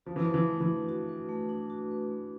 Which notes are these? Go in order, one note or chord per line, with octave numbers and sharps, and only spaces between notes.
F3 F#4
E3
F3 B4
E3
A3
E3
D4
F#4
B4
A3
D4
F#4
B4
A3